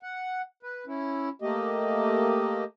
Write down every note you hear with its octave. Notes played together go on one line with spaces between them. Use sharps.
F#5
B4
C#4 E4
A3 A#3 G4 D#5